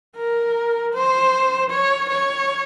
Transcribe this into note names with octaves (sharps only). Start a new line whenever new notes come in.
A#4
C5
C#5
C#5